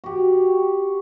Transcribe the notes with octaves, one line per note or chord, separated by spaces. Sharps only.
F#4 G4